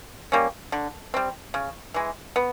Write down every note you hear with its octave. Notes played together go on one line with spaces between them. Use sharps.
G3 A#3 C#4
D3
G3 C4
C#3
E3 G#3
B3